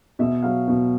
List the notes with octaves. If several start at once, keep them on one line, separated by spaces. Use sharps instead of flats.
B2 E5
F#3 F5
B2